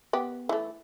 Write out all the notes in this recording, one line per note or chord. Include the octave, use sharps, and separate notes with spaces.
B3 G4
E3 A3